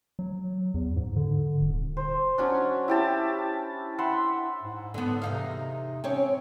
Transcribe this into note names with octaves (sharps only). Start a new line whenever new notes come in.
F#3
E2
G#2
D3
D#1
C5
F#3 C#4 D4
E4 G4 A5
E5 F#5 B5 C6
G#2
D3 B3
E2 C3 D#4 F5
C4 C#4 C#5